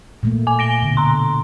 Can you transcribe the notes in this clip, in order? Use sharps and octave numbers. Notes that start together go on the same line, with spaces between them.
A#2 A3 A#3
G#5 D6
A#6 D7 G7
B2 D3
B2 A#5 C6